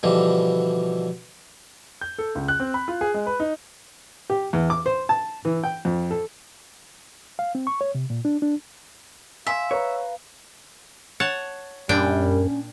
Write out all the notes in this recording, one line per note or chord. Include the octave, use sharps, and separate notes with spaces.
B2 D3 E3 F3 G3
G6
A4
C#2
F#6
C4
B5
F4
G#4
G#3
B4
D#4
G4
E2
D6
C5
A5
E3
G5
F2
A4
F5
C4
C#6
C#5
C3
A#2
D4
D4
E5 F5 G#5 C6
B4 C#5 A#5
C#5 F#5 A5
F#2 A#2 G3 C#4 D4 G5